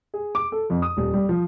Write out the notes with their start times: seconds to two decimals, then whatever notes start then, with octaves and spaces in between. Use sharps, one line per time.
0.14 G#4
0.35 D6
0.52 A4
0.70 F2
0.82 D#6
0.97 D#1
1.14 G3
1.29 F3